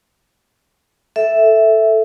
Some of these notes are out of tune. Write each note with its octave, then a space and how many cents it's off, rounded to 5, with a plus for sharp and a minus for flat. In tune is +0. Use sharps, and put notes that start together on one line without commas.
A4 +0 E5 +0